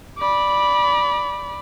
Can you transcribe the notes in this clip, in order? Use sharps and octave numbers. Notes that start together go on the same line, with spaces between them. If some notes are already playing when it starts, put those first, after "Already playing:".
D5 B5